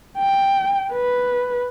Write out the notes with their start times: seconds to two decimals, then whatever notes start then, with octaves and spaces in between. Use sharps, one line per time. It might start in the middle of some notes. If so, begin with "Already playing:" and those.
0.18 G5
0.93 B4